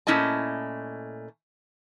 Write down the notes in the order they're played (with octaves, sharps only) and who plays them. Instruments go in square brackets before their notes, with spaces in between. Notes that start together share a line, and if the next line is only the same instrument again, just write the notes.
[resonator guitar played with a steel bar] A#2 A3 C#4 E4 D#5 A5